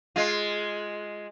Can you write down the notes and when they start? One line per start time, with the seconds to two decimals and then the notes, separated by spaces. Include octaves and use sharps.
0.16 G#3 F4